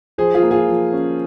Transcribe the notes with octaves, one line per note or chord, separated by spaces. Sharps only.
F3 G#4 C5
F4 G#4
A#3
F4 G#4
F3
C#4